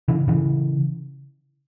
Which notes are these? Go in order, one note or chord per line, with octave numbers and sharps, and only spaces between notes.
C#3 E3
C#3 E3